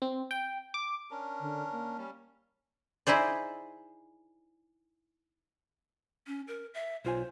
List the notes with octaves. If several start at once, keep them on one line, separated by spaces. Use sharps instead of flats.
C4
G5
D6
C#4 D4 A#4
D3
A#3
G3 C#4
D#4 E4 G#4 C5 D5
C#4
A#4
E5
B1 F4 C5 G#5